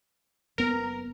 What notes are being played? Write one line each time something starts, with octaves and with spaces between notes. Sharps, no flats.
F#1 B3 A#4